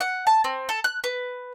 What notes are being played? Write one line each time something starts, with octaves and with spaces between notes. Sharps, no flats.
F#5
A5
C4
A4
F#6
B4